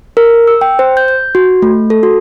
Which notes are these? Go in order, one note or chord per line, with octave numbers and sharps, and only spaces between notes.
A#4
E6
G5
C5
G6
G6
F#4
A3
A4
F#4